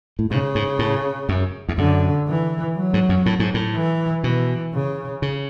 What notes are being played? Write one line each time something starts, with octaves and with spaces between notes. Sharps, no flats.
A2
G#2 C#3
G#2
A2
F#2
E2
F#2 D3
E3
F#3
G#2
F#2
A2
G#2
A2
E3
B2 E3
C#3
C#3